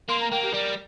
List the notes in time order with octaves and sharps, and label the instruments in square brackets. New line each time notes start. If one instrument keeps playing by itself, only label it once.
[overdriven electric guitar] A#3 [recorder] C6
[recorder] A#5
[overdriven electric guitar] A#3 [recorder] G5
[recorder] G4
[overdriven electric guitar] G3 [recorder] A#4